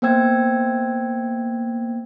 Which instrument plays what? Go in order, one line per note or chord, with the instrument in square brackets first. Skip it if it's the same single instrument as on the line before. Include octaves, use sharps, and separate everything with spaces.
[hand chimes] A#3 B3 C5 G5 E6 G#6